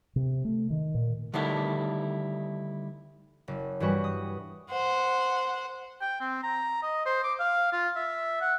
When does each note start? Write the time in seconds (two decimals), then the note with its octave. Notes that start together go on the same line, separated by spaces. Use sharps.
0.16 C3
0.45 A3
0.70 D#3
0.95 A#2
1.34 D3 D#3 G3 A3 E4
3.48 F#1
3.80 G2 E3 G3 F#4
4.04 D#6
4.70 C5 F#5
6.01 G5
6.21 C4
6.43 A#5
6.83 D#5
7.06 C5
7.23 D6
7.39 F5
7.72 F4
7.96 E5
8.41 F#5